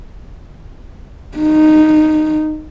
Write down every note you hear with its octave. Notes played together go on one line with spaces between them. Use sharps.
D#4